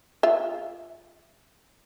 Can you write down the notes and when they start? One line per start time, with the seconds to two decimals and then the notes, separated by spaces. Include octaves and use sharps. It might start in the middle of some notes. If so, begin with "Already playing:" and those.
0.23 F4 E5